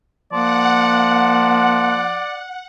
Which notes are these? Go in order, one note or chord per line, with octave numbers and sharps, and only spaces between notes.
F3 A#3 D5 F#5